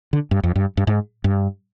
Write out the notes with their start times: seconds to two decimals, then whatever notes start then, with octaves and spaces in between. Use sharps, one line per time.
0.13 D3
0.31 G2
0.44 F2
0.56 G2
0.77 G2
0.87 G#2
1.24 G2